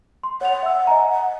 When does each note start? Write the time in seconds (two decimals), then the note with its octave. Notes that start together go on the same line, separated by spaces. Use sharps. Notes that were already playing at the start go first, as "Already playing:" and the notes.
0.23 C6
0.41 C#5 F#5 F7
0.63 E5 E6
0.87 D#5 G#5 A#5